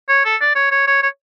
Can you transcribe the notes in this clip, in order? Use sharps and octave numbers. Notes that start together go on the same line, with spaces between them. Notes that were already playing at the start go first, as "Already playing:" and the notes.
C#5
A4
D5
C#5
C#5
C#5
C#5